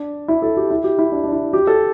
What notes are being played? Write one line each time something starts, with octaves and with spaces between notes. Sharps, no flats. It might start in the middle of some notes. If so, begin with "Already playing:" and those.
Already playing: D4
E4
A4
G4
E4
G4
E4
D4
D4
E4
G4
A4